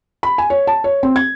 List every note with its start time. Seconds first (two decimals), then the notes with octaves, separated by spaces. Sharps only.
0.23 B5
0.38 G#5
0.50 C#5
0.67 A5
0.84 C#5
1.03 C4
1.16 G#6